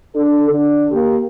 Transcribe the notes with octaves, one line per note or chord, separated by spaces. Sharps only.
D4 A4
D3 D4
A#3 G4